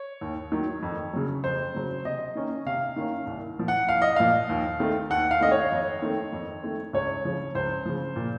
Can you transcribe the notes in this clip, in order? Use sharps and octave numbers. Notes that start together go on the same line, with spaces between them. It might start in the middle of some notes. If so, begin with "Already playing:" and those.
Already playing: C#5
D#2
D#3 F#3
F2
C#3 F#3
F2 C5
C#3 F#3
C3 D#5
D#3 A#3 C#4
C3 F5
D#3 A#3 C#4
C2
A#2 F3
F#5
C2 F5
D#5
A#2 F3 F5
D#2
D#3 A3 C4
D#2 F#5
F5
D#3 A3 C4 D#5
C#5
F2
D#3 A3 C4
F2
D#3 A3 C4
C#2 C#5
C#3 F3
C#2 C5
C#3 F3
A#2